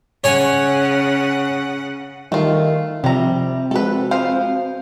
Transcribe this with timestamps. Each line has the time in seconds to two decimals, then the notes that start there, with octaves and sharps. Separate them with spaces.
0.24 C#3 C#5 F#5 G#5
2.32 D#3 G3 A3 F4
3.04 C3 F3 G3 C4 E5 A#5
3.71 G#3 F#4 A4 B4
4.11 F3 C5 F5